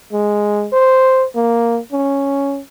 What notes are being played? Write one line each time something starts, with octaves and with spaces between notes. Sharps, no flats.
G#3
C5
A#3
C#4